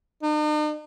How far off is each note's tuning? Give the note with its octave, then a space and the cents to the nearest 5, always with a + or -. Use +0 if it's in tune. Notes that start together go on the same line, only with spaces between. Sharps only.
D#4 -45